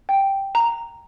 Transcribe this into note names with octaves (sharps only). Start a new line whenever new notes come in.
G5
A#5